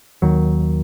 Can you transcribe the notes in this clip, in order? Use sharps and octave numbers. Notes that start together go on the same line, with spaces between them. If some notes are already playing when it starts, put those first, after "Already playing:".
D#2 D#3 F#3